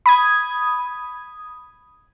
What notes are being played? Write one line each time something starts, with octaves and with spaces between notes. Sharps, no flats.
B5 D#6 G#6